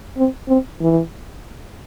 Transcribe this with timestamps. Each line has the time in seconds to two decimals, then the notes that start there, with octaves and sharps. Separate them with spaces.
0.17 C4
0.48 C4
0.81 E3